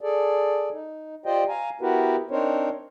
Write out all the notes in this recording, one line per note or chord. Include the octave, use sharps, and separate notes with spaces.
G#4 A4 D5
D#4
F4 G4 C5 D5 D#5 G5
F5 G#5 A#5
B3 E4 F#4 G4 A#4 B4
C4 D4 D#4 A#4 C5 C#5